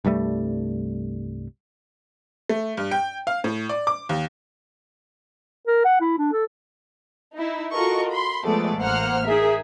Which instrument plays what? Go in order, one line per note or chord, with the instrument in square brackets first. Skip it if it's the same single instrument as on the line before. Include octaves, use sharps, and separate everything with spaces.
[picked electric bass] C2 G2 G3 A3
[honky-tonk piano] A3
G2
G5
F5
A2
D5
D6
D#2
[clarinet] A#4
F#5
E4
D4
A4
[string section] D#4 E4
F4 F#4 A4 A#4 D#5 C#6
B5 C6
F3 G#3 A3 B3 A4 D5
A1 A#3 C5 F#5 F6
D#4 G#4 A#4 E5